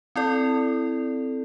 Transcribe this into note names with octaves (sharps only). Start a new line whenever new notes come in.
C4 E4 A4 D5